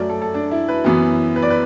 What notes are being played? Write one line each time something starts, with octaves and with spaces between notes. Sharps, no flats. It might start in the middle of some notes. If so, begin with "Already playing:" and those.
Already playing: F#2 F#3 A3 D5
A4
A4
D4
E4
B4
F#2 E3 B3
B4
D5
B4